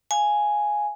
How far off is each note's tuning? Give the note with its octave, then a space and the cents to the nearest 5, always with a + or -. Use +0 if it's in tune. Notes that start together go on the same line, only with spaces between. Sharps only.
F5 +0 G#5 +0